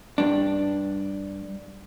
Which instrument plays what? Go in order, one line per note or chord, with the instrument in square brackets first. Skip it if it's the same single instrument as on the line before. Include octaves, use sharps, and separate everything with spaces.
[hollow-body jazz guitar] G2 D4